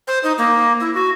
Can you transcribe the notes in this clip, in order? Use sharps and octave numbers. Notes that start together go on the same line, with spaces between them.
C5
D#4
A#3
E4
F#4